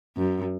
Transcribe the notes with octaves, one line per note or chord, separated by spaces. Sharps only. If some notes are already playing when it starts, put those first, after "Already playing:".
F#2